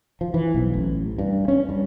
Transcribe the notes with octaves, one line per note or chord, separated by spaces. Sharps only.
F3
E3
B1
A1
G2
C#4
G2